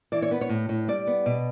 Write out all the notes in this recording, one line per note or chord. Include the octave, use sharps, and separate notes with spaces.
E3 D5
C#5
B3 B4
C#5
A2
A2
G3 D5
B3
B2